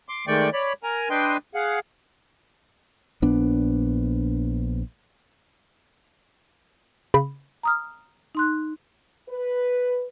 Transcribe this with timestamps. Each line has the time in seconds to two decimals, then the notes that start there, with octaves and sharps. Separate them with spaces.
0.09 C6 D6
0.27 D#3 G#3 A3 D5 G5 C#6
0.53 C#5 D5 B5
0.83 A#4 G#5 A#5
1.10 D4 B4 D#5 G5 C6
1.55 G#4 F5 F#5
3.22 A#1 B3 D4
7.14 C#3 B5
7.63 A#5 D#6 F6
8.35 D#4 C6 F#6
9.28 B4